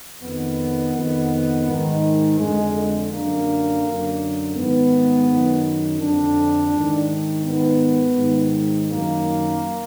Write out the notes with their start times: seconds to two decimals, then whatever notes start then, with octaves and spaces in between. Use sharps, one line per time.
0.21 F2 D#3 B3
0.94 F2 D#3
1.66 G#2 D#3
2.38 F2 D3 G#3
3.11 F#2 D3 A#3
3.83 F#2 D3
4.55 G#2 D#3 B3
5.28 F#2 D#3
5.99 F2 D3 D4
6.72 G#2 D#3
7.44 G#2 D#3 B3
8.17 G#2 D#3
8.89 F#2 D#3 A#3